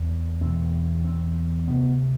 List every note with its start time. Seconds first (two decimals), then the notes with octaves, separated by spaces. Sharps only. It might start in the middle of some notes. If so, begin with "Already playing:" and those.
Already playing: E2 C4
0.41 E2 B2 C4
1.04 C4
1.68 D2 C3 B3